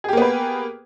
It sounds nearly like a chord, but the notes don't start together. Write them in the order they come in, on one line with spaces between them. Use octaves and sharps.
G#4 G4 A#3 B3 B4